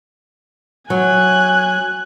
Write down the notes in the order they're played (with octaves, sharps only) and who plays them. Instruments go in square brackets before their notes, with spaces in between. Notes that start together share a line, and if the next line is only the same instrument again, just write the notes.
[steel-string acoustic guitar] F#3 [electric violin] G#5 F#6